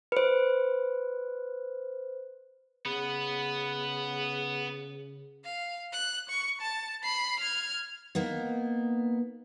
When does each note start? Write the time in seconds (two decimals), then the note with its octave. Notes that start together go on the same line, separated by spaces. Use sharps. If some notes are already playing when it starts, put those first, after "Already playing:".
0.12 B4 C5
2.86 C#3 B3
5.45 F5
5.92 F#6
6.29 C#6
6.61 A5
7.03 B5 C7
7.40 F6 G#6
8.15 A#3 B3 D#4